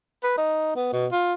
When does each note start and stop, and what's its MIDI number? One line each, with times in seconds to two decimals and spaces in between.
0.23 0.33 71
0.38 0.73 63
0.76 0.89 59
0.93 1.07 47
1.12 1.34 65